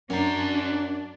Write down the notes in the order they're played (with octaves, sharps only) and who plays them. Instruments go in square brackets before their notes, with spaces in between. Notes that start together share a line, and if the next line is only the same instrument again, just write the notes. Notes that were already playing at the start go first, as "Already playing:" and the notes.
[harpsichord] F#2 [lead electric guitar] C#4 A#5 [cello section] D4